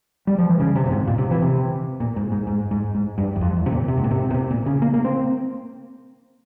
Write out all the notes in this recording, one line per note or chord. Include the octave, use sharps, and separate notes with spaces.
G3
F3
E3
C#3
C3
A#2
G#2
A#2
C3
E3
C3
A#2
G#2
G#2
G#2
G#2
G#2
G2
E2
F2
E2
C3
A#2
C3
G#2
A#2
C3
A#2
C3
A#2
C#3
A#3
A#3
C4